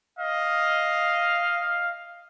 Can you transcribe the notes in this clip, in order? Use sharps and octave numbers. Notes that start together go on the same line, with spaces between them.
D#5 F5